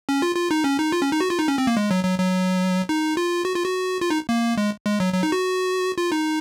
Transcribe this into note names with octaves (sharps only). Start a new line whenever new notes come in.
C#4
F4
F4
D#4
C#4
D#4
F4
C#4
D#4
F#4
F4
D#4
C#4
C4
A#3
G#3
F#3
F#3
F#3
D#4
F4
F#4
F4
F#4
F4
D#4
A#3
G#3
G#3
F#3
F#3
D#4
F#4
F4
D#4